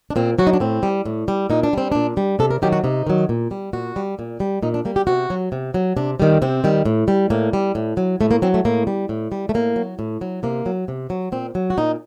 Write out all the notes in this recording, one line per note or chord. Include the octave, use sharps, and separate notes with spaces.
D4
A#2 C4
F#3 F#4
D#4
D4
A2 C4
G3
A2
G3
A#2 D#4
D4
G3 C4
A#2 D4
G3
C3 A4
A#4
D#3 F#3 G4
F#4
C3 D#4
D#3 F#3
A#2
G3
A#2 F#4
G3
A#2
G3
A#2 D#4
D4
G3 A#3
G4
C3 F#4
F#3
C3
F#3
C3 D4
D#3 G3
C3 C4
D#3 G3
A2
G3
A2 A#3
G3
A2
F#3
A2 A3
A#3
F#3 C4
A3
A2 A#3
G3
A2
G3
A3
A2 A#3
F#3
A2
F#3
C3 A#3
F#3
C3
F#3
A#2 C4
F#3
F#4
A#2 D#4